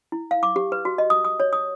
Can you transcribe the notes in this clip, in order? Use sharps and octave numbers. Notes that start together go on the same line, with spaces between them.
E4
F5
D6
G4
B4
F#4
D#5
D#6
D#6
C#5
D#6